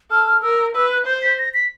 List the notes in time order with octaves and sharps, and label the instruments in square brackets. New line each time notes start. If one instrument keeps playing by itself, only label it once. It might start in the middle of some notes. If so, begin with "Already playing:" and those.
[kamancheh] A4 [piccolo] F6
[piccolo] F6
[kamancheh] A#4 [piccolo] E6
[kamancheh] B4 [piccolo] E6
[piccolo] F#6
[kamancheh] C5 [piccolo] G6
[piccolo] B6
A#6
B6